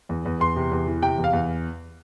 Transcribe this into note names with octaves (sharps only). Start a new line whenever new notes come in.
E2
E2
E2 C6
C3
E2
E3
C3 G5
E2
F5
E2